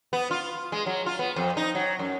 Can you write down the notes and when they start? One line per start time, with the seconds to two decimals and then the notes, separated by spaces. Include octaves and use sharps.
0.13 B3
0.31 F4
0.72 G#3
0.86 F#3
1.06 F4
1.19 B3
1.36 F2
1.57 D#4
1.75 F#3
1.99 F#2